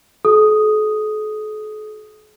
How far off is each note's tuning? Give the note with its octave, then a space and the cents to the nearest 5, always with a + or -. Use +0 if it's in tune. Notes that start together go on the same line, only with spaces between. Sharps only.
F#4 +15 A4 -45 D#6 +0